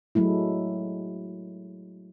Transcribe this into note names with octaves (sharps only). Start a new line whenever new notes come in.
F#3 G#3 A3 E4